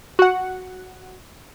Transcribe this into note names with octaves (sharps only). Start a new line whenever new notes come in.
F#4 F#5